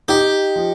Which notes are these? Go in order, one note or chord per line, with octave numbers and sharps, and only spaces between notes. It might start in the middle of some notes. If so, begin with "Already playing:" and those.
D#4 G4
F3